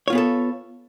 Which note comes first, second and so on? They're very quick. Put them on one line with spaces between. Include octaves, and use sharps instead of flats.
C#5 F4 B3 G#4 A4